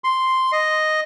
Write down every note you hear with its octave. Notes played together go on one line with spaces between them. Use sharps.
C6
D#5